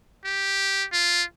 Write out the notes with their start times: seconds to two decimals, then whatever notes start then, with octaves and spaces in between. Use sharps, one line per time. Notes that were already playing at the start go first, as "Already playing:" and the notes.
0.25 G4
0.92 F4